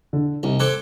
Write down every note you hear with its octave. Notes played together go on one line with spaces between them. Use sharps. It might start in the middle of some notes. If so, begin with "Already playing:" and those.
D3
C2 D#4
C4 A4 D6 F#6 G#6